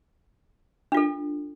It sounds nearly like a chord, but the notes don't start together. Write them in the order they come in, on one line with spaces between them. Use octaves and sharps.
D4 F4 A4